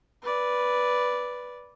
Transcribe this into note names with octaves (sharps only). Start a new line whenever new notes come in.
B4 D5